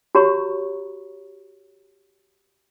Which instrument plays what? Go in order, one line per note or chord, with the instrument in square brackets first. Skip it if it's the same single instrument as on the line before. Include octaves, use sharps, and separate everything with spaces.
[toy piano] F#4 G4 C#5 A#5 B5 C#6